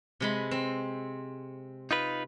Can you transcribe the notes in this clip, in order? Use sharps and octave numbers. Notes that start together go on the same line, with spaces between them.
C3 G#3 B5
C4
D#4 F4 B4